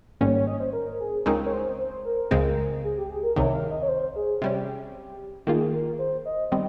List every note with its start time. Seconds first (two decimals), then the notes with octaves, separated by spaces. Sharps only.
0.21 G#1 G#2 G3 A#3 C#4 C#5
0.34 C#5
0.47 D#5
0.60 C5
0.73 A#4
1.00 G#4
1.26 C#2 C#3 G#3 C4 D#4 A#4
1.46 C#5
1.53 C5
1.78 C5
2.05 A#4
2.31 C#2 C#3 G#3 C4
2.84 G#4
2.97 G4
3.10 G#4
3.23 A#4
3.36 C2 C3 D#3 C#5
3.54 F5
3.71 D#5
3.83 C#5
3.89 C5
4.16 G#4
4.41 C3 G3 C#4 G4
5.47 D#3 A#3 F4 G#4
5.73 A#4
5.99 C5
6.26 D#5
6.52 D#3 G3 C4 D#5